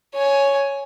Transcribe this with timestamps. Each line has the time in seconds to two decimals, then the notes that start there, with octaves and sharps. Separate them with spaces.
0.14 C#5 G#5